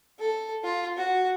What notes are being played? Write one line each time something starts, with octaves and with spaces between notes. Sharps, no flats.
A4
F4
F#4